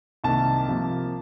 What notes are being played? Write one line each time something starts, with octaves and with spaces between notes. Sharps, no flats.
C2 C3 D#3 A#3 A5
C3 F3 A#3